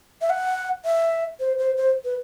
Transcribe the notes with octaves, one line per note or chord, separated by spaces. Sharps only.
E5
F#5
E5
C5
C5
C5
B4